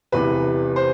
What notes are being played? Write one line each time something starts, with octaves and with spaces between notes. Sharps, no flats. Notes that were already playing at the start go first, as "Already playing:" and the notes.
F1 E2 C3 E3 B4
C5